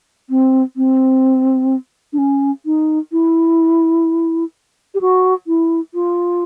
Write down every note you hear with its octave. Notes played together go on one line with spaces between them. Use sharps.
C4
C4
D4
C#4
D#4
E4
G4
F#4
E4
F4